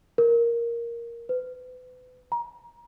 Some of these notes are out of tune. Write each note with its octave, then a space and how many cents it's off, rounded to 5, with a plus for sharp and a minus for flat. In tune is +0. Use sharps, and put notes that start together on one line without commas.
A#4 +5
B4 +35
A#5 +30